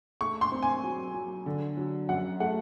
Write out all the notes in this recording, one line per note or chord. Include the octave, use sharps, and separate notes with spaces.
A3 C#6
C6
C4
G#5
F#3
F#3
D3
F#3
F#2 F#5
A3 F#5